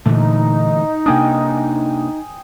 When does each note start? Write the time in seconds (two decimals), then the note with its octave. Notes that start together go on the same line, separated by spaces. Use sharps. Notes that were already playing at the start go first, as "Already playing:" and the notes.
0.06 A#2 D3 E3 A3 D#4
1.06 C3 A#3 D4 G5 G#5 D#6